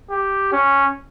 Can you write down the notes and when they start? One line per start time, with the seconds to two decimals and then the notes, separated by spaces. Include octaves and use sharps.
0.10 G4
0.52 C#4